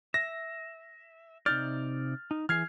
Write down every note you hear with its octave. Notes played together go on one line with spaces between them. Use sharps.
E5 A#6
C3 D#4 D5 F6 G6 A6
D#4
E3 G#4 F6 G#6 C7